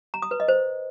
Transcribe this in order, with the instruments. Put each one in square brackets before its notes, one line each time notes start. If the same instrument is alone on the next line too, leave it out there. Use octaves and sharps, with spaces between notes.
[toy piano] A#5
D#6
B4
D#5
C5